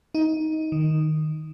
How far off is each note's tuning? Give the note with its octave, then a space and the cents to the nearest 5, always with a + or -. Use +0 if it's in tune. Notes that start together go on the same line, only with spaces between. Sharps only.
D#4 +15
D#3 -10